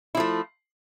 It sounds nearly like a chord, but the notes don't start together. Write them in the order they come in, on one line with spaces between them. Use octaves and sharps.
E4 F3 A3